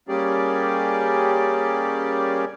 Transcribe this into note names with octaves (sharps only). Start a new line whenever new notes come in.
G3 A#3 C#4 G4 G#4 D5